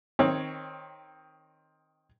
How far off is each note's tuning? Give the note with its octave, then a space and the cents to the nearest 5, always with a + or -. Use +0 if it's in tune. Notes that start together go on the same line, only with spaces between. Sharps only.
D#3 +0 C4 +20 C#5 +0